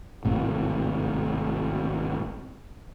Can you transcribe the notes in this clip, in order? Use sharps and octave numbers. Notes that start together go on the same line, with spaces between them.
G#1 A2 C3